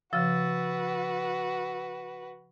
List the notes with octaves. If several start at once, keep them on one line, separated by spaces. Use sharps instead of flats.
C#3 F3 F#4 B4 E6 A6